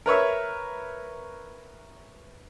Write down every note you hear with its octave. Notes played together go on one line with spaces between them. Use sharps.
A#4 B4 C#5 E5